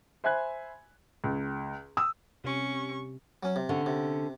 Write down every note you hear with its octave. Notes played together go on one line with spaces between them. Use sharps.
C5 E5 G#5 B5 F#6 G#6
C#2
D#6 E6
C3 C#4 C#6
F#3 C#4
C3
D3 C#4
C3